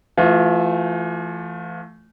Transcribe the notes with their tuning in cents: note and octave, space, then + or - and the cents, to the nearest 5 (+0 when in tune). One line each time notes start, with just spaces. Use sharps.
E3 +40 A3 +0 F4 +30